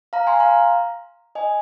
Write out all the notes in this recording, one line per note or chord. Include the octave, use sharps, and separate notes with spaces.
F5 A#5
G#5 C6
F5 A#5
D#5 G#5